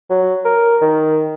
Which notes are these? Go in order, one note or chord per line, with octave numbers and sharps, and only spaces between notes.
F#3
A#4
D#3